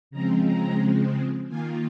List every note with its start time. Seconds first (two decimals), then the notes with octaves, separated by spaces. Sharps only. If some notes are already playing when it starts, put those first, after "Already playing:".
0.11 C#3 F3 G#3 C4 A#5
0.45 A#5
1.48 D#3 A#3 F4 G#5